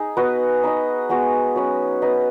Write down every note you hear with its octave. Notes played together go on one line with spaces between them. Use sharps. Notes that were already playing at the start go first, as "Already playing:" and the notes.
Already playing: D#4 G#4
B3 F#4 B4 D#5
D#4 B4 D#5
G#3 B3 F#4
F#3 C#4 B4
B3 D#4 B4 D#5